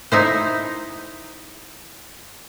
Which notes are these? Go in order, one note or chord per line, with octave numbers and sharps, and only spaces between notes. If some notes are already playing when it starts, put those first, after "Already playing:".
D#4 E4 C5